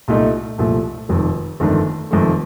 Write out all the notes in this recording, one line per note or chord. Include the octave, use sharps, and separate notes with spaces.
C2 A#2 A3 D#4
C2 A#2 F3 A3
F1 F2 D#3
G1 F2 D#3 A3 D4
F1 F2 D#3 A3